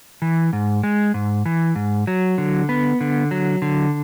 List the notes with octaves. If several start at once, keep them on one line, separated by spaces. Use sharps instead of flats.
E3
G#2
G#3
G#2
E3
G#2
F#3
D3
B3
D3
F#3
D3